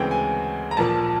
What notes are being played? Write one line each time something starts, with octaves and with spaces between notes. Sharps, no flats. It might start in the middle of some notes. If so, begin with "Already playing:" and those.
Already playing: D2 C#3 E3 G#3 C4 G5
G#5
A#5
A#1 A#2 F3 A#3 A5